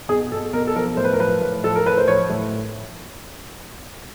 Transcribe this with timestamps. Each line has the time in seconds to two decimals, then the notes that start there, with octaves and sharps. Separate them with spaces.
0.08 B2 G#4
0.32 B2 A4
0.53 B2 A#4
0.67 A4
0.75 F3 A#4
0.97 A2 C5
1.04 B4
1.13 A#4
1.19 F3 B4
1.41 A2
1.64 F3 A4
1.75 A#4
1.86 A2 B4
1.97 C5
2.08 F3 C#5
2.30 A2